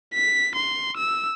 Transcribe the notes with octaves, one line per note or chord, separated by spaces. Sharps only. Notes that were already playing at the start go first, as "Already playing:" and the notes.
B6
C6
E6